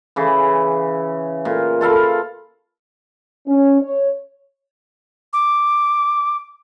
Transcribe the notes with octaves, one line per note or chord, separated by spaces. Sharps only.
C#3 E3
A#2
F4 A4 F5 B5
C#4
C#5
D6